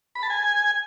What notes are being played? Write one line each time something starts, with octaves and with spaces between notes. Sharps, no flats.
B5
A5
G#5